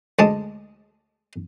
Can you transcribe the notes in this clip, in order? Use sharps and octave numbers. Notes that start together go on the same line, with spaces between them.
D2 G#3 D#5 A5